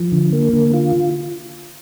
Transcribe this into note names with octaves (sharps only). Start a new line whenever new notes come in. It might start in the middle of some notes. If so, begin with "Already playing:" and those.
Already playing: F3
D3
A#3
D3
F4